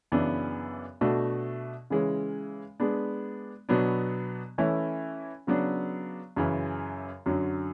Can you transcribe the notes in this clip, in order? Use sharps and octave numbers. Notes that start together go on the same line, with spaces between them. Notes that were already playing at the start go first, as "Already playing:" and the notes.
F#2 C#3 E3 B3 D4
B2 A3 D4 F#4
C#3 E3 G#3 C#4
G#3 B3 D4
B2 F#3 B3 D4
E3 A3 C#4 E4
C#3 F#3 B3 D4
F#2 C#3 E3
F#2 D3 F#3